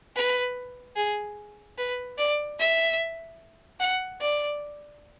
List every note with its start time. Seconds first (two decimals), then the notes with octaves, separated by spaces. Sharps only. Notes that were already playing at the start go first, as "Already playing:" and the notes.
0.16 B4
0.96 G#4
1.78 B4
2.18 D5
2.59 E5
3.80 F#5
4.21 D5